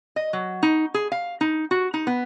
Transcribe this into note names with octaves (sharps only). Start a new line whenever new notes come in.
D#5
F#3
D#4
G#4
F5
D#4
F#4
D#4
B3